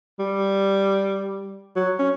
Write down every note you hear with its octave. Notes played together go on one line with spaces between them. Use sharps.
G3
F#3
C#4